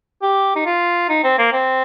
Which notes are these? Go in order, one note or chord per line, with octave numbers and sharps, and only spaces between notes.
G4
D#4
F4
D#4
C4
A#3
C4